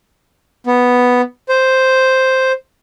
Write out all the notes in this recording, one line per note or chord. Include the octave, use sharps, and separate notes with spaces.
B3
C5